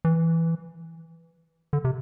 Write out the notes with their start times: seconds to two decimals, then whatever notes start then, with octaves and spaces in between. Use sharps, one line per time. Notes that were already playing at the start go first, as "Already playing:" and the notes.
0.05 E3
1.73 D3
1.85 C3